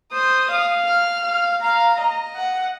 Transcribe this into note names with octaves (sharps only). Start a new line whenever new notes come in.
C5 D#6
F5
F6
F5
F5 A#5
D#5
F#5